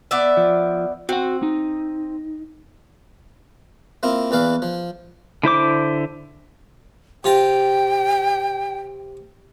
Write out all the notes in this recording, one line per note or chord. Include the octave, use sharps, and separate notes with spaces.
B3 D5 E5
F3
C4 F#4 F#5
D#4
A#3 C4 E4 F4
E2 E3 B4 D5 F5
F3
D3 E4 C5 D6
C3 F4 G5 A#5